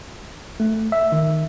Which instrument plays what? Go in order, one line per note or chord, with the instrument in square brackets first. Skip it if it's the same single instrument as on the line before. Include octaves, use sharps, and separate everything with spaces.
[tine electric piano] A3
E5
D#3